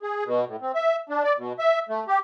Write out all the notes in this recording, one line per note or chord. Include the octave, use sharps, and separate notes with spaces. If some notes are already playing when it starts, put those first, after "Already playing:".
G#4
B2
A2
C4
E5
D4
D5
B2
E5
A3
G4